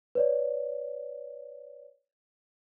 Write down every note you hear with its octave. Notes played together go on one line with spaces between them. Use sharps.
B4 C#5 D5